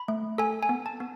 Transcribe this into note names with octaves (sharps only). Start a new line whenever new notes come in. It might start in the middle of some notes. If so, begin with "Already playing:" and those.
Already playing: B5
A3
A4 G#5
G#5
B3
A5
B3